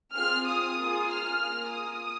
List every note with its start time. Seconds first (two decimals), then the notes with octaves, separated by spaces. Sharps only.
0.15 C4 F4 G#4 F6
0.46 D#6
0.78 A#3 F4 G#4
1.10 F6
1.41 A#3 F4 G#4
1.72 D#6